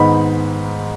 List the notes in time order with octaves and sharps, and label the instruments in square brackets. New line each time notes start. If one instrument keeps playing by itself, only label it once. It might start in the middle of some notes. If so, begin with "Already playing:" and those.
Already playing: [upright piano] G#2 D#3 G#3 B3 D#4 [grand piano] B5